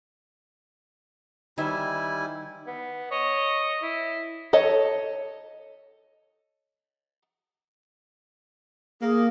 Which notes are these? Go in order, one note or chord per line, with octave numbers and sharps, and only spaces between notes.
D#3 G3 E4 C5 E5 G#5
B3
C#5 D#5
E4
A4 C#5 D#5
A#3 G#4